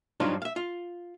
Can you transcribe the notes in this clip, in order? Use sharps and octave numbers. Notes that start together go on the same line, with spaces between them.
G2 F3 F#3 D4 D#4 F4
E5 F5
F4